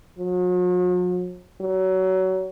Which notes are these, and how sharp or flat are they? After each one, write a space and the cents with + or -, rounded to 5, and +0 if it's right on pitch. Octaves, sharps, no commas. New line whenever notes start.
F#3 -45
F#3 +25